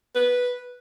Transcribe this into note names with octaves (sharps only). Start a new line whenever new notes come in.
B4